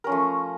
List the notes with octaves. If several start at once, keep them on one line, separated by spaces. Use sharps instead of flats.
F3 A3 C#4 A#4